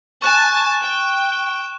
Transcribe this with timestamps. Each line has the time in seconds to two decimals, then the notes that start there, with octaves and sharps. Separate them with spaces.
0.22 G#5 A5 C#6 F#6 E7
0.81 G5